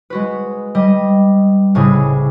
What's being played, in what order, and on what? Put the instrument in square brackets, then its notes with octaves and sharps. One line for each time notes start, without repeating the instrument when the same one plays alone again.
[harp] G#3 F#4 B4
G3 D#5
C2 A2 C#3 G#4